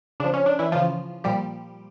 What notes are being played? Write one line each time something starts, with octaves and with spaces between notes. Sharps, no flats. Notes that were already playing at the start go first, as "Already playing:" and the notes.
C#3 F3 D4
C#4
D4
E3 E4
C#3 E3 F3 F4
A#2 F3 G3 G4